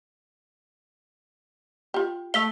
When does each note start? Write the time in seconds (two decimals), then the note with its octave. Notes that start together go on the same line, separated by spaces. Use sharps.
1.94 F4 G4
2.34 A3 F5 E6 B6 G7